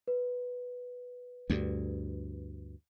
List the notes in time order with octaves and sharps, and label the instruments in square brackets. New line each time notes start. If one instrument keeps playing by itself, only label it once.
[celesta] B4
[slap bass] D2 G2